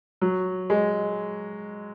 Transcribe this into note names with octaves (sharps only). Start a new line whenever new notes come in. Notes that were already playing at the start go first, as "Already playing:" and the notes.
F#3
G#3